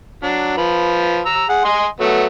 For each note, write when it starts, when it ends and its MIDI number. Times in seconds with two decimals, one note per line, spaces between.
0.23 0.54 54
0.23 0.54 62
0.57 1.20 53
0.57 1.20 71
1.26 1.44 82
1.26 1.44 88
1.49 1.61 68
1.49 1.61 78
1.65 1.86 75
1.65 1.86 80
1.65 1.86 84
2.00 2.25 54
2.00 2.25 57
2.00 2.25 59